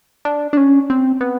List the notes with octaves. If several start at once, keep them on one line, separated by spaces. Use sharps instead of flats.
D4
D4
C#4
C4
B3